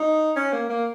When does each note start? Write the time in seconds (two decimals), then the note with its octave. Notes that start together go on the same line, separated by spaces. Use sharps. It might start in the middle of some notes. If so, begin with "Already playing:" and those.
Already playing: D#4
0.36 C#4
0.53 A#3
0.70 A#3